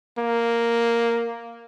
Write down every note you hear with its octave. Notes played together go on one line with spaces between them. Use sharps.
A#3